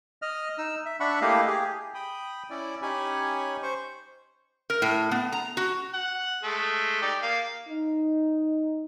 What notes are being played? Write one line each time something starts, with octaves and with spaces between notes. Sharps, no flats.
D#5 F6
D#4 E6
E5
D4 E5 F#5 B5 C#6
A3 A#3 E4 G4 D#5 F5
G4 G#4
G5 B5 D#6
C#4 E4 D5
C#4 D#4 G4 C#5 G#5 B5
C5 C#6
A#4
A2
B3
A#5
F#4
F#5
G#3 A3
D#4 G4 D5
A#3 F5
D#4